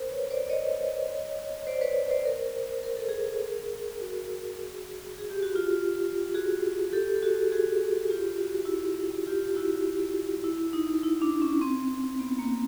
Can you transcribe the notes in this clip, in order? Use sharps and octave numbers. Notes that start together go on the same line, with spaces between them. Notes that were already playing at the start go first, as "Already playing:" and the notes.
Already playing: A#4 C5
B4 C#5
C5 D5
C#5 D#5
C5 D5
B4 C#5
C5 D5
A#4 C5
A#4
A4
G#4 A#4
F#4 G#4
G#4
G4
F#4
F4 G4
F#4 G#4
G4 A4
A4
F#4 G#4
F#4 G#4
F4 G4
F#4
G4
E4 F#4
F4 G4
E4 F#4
E4
D#4
E4
D4
C#4
C4
B3
A#3